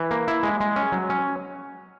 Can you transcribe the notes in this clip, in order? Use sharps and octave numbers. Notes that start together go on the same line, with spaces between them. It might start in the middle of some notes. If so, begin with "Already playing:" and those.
Already playing: E3
A#3
E4
G#3
G#3
C#4
F#3
C#4